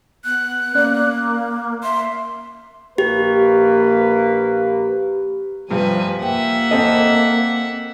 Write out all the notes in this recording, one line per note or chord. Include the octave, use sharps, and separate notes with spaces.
B3 F#6
A#3 C#4 D5
E5 C6
A#1 A#3 G4 B4
G2 C3 F3 G3 B4 G#5
A#3 G4 E5 F#5
C4 A4 D#5